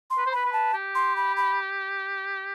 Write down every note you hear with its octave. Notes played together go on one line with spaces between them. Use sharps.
C6
B4
C5
B4 B5
B4
A5
G4
C6
B5
B5